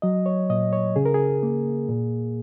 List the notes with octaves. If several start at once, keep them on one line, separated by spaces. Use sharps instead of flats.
F#3 D#5
C#5
A#2 D#5
C#5
C#3 G#4
A#4
G#4
A#3
A#2